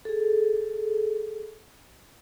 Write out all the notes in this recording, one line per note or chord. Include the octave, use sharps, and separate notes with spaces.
G#4 A4